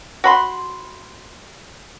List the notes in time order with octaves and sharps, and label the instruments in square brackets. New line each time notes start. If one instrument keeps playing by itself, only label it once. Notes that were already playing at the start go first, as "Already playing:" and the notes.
[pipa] F#4 B5 C6